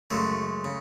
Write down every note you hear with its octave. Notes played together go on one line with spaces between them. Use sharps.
F#2 C#3 G#3 A3
C#3